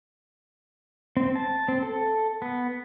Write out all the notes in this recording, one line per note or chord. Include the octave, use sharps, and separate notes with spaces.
C4
A5
C4
A4
B3